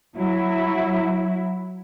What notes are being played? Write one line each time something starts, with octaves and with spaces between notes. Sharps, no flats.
F#3 E4